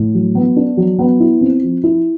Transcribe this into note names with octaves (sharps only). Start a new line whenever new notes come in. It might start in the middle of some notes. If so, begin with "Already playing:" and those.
Already playing: A2
F#3
B3
D4
F#3
B3
E4
C4
F3
E4